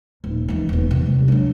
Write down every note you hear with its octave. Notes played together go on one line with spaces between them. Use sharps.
D#1
E2 D#3
E1 B3
C3 D#3
G3
F#3 D4